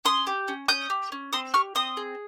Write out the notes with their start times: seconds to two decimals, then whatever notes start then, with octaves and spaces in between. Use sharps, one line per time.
0.05 C#4 C6 D#6
0.27 G4
0.48 C#4
0.68 C#4 D#6 G6
0.90 G4
1.12 C#4
1.33 C4 C6 D#6
1.54 G4 C#6 F6
1.75 C4 C6 D#6
1.97 G#4